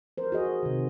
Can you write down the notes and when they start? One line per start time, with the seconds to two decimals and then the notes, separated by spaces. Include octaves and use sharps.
0.18 F3 A#4 C5
0.32 F#4 G#4 D#5
0.63 C3 D#3